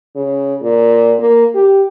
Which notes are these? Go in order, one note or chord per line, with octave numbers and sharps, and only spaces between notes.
C#3
A#2
A#3
G4